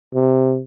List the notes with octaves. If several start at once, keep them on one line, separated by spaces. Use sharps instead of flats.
C3